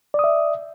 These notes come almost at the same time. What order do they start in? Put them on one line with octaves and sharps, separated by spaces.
D5 D#6 E5